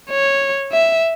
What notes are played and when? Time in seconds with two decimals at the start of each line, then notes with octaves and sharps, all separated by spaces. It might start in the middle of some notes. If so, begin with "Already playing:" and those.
0.11 C#5
0.72 E5